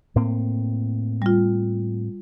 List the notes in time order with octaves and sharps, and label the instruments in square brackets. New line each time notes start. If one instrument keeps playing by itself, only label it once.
[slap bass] A2 A#3 C4
[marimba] G3 F4